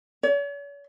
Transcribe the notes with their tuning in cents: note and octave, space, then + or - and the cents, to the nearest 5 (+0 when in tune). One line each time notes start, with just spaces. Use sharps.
C#5 +45